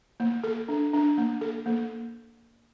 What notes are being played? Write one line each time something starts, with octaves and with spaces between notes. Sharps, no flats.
A#3
A4
D4
D4
A#3
A4
A#3